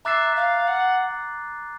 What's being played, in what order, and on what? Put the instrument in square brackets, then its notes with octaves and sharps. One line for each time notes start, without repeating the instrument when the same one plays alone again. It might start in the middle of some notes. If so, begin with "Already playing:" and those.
[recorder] E5 [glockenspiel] A#5 D6 F#6 A6 C7
[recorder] F5
F#5